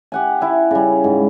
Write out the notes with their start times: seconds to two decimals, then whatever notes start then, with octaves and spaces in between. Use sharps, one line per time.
0.12 G4 F#5 G#5
0.41 E4 G#5
0.71 C#3 G3
1.04 G#2